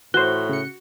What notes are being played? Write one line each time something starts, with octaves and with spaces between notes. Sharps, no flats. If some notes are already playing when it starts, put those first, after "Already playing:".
A2 E3 F#4 C5 F#6 G7
C#3 C#7